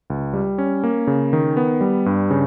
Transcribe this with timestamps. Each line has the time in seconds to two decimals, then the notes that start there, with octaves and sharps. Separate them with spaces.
0.10 C#2
0.33 G3
0.58 C#4
0.84 A#3
1.07 C#3
1.33 D#3
1.57 B3
1.81 G3
2.06 G2
2.31 C#3